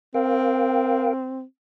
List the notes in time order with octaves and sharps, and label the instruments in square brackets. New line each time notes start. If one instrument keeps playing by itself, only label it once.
[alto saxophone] C4 [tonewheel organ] A#4 F5 G5